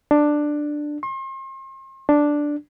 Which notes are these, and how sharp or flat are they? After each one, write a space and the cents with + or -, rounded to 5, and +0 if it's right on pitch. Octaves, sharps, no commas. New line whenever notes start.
D4 +10
C6 +40
D4 +0